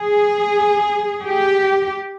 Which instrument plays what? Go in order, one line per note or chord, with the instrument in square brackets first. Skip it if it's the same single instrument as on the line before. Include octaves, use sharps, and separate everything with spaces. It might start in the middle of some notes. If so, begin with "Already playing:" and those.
Already playing: [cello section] G#4
G4